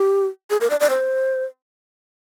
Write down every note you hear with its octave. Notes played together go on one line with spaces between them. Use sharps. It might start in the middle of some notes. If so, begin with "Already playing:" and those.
Already playing: G4
G#4
A#4
D5
D5
C5